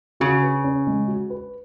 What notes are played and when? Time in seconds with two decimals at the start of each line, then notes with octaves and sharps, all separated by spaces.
0.20 C#3 F#4
0.43 B4
0.64 C#4
0.87 G#3
1.08 F#4
1.30 B4